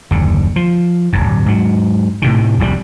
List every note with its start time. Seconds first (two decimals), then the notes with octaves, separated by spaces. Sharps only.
0.11 F#1 D#2 D3
0.56 F3
1.13 D1 G1 G2
1.46 G#2 F#3
2.22 A2 C3 D#3
2.59 F1 C2 A#2 G3